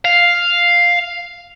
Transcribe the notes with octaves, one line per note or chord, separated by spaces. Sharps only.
F5